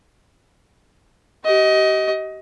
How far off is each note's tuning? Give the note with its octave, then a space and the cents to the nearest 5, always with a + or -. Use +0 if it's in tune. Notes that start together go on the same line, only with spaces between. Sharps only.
G4 -35 D#5 +20